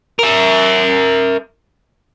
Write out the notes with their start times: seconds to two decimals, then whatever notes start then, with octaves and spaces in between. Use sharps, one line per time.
0.19 A#4 E5